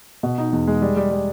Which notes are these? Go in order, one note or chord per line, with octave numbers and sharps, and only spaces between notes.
B2
D#4
E2
G#3
G3
G3
G3